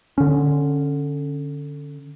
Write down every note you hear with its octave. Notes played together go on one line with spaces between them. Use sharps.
D3 C#4